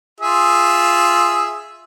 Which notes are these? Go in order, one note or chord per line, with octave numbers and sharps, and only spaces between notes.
F4 G#4 E5